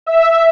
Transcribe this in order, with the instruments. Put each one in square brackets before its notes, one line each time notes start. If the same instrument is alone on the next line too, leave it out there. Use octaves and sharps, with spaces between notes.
[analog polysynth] E5